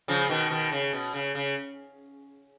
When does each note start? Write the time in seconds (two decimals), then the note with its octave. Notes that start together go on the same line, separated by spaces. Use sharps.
0.08 C#3 F3
0.30 B2 D#3
0.50 B2 D#3
0.72 C#3
0.93 B2
1.14 C#3
1.35 C#3